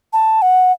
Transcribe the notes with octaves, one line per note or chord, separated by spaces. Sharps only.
A5
F#5